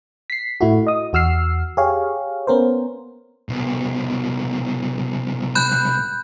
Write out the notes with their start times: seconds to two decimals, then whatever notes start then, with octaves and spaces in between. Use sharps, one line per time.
0.30 B6 C7
0.61 A2 A3 E4 F#4
0.87 D#5 D#6
1.13 E2 F#4 E6 F6 C7
1.77 G4 G#4 C#5 F5
2.47 B3 C#4 A#4 C5
3.49 C2 B2
5.55 B5 F#6 G6